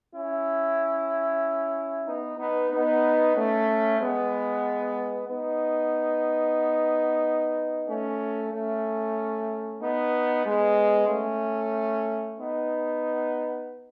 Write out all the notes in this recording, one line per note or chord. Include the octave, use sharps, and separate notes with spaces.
C#4 E4
B3 D#4
B3 D#4
B3 D#4
A3 C#4
G#3 B3
B3 D#4
A3 C#4
A3 C#4
B3 D#4
G#3 B3
A3 C#4
B3 D#4